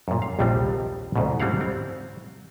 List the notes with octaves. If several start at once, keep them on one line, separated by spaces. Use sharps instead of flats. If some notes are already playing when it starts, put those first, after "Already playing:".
F#2 A#2
F5
A#1 D#2 C3 F3 G3 C4
D2 G#2 B2
F#3 G3 C4 E4 F5 F#5
C4